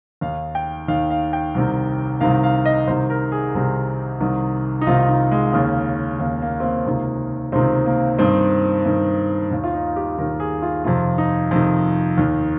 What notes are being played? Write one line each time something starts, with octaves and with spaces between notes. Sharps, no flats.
D#2 D#3 F5
G5
D#2 D#3 F5
F5
G5
C2 C3 D#3
C2 C3 D#3 F5
F5
D#5
C2 C3 D#3 C5
A#4
G#4
C2 C3 D#3
C2 C3 D#3
D#4
C2 C3 D#3 F4
D#4
G#3
D#2 C#3 A#3
D#2 C#3 A#3
A#3
C4
A#3
C#2 C3 D#3
C#2 C3 D#3 C4
A#3
G2 D#3 C4
G2 D#3
D#2 D#3
F4
D#4
G4
D#2 D#3 A#4
G#4
F4
F2 C3 D#3 F4
D#4
F2 C3 D#3
D#2 D#3